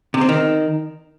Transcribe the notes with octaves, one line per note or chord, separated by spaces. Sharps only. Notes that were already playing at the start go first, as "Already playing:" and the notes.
C3
C4
D#3